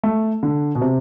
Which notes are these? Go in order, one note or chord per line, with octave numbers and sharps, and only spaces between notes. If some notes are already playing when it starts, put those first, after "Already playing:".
A3
D3
B2
C3